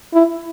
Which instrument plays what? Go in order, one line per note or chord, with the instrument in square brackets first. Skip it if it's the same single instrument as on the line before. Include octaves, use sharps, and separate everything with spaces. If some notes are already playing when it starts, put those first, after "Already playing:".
[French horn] E4